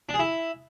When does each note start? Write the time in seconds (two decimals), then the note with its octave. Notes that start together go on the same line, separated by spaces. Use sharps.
0.09 D4
0.14 G#4
0.19 E4